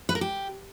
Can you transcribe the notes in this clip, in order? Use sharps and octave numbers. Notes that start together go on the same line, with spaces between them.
B4
A#4
G4